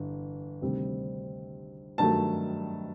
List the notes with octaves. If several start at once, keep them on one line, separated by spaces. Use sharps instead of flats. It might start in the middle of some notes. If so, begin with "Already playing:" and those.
Already playing: G1 E3
D2 C3 D#3 G3 C4
G2 D#3 F#3 A3 A5